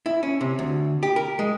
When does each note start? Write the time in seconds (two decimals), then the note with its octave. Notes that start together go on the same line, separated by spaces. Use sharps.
0.06 E4
0.23 C#4
0.41 C3
0.59 D2
1.03 G4
1.16 A#4
1.39 G#3